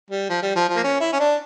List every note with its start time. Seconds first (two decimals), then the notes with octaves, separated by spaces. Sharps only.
0.10 G3
0.30 F3
0.42 G3
0.56 F3
0.69 F3
0.76 A#3
0.84 C#4
1.01 E4
1.12 C#4
1.20 D4